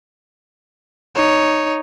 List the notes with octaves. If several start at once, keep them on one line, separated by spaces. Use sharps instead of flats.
D#4 C#5